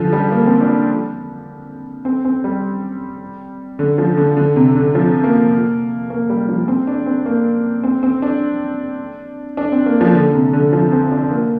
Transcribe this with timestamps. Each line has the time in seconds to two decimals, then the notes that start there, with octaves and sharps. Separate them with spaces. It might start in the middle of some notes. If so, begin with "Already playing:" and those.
Already playing: D3 F3
0.13 G3
0.31 A#3
0.46 C4
0.61 D4
2.05 C4
2.25 C4
2.44 G3
3.79 D3
3.98 F3
4.17 D3
4.37 D3
4.56 C3
4.75 D3
4.95 F3
5.24 A#3
6.10 A#3
6.30 G3
6.49 F3
6.68 C4
6.87 D4
7.06 C4
7.26 A#3
7.83 C4
8.03 C4
8.22 D4
9.57 D4
9.72 C4
9.86 A#3
10.01 F3
10.15 D3
10.34 C3
10.53 D3
10.73 F3
10.92 C4
11.12 D4
11.31 A#3